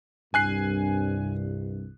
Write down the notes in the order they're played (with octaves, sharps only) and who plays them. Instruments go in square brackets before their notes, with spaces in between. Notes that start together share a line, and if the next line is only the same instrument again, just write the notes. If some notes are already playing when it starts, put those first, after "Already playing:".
[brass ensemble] C2 G2 [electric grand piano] G#5 F#6 C7